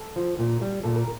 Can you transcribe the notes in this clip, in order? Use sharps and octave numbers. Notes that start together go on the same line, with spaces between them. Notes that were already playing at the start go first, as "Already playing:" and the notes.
Already playing: A4
F3
A#2
G3
A#2 A4
A#4